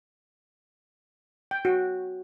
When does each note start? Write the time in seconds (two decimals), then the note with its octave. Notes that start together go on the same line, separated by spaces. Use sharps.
1.51 G5
1.65 F#4